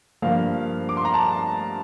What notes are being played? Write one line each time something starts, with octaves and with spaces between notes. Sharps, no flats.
G2 F3 A#3 F5
D6
C6
A#5
A5